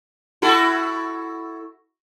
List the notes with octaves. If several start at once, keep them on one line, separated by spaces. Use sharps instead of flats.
E4 F#4 A4